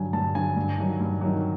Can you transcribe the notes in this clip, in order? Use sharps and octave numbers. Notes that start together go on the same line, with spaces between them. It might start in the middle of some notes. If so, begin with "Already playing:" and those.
Already playing: G2 D3 F#3 G#5
G2 A5
D3 F#3 G#5
G2
D#3 F#3
G2
D#3 F#3